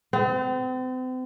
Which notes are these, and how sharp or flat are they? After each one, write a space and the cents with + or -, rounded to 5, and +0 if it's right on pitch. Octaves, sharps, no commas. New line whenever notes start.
C4 -40